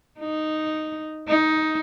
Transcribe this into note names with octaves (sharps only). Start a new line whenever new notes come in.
D#4
D#4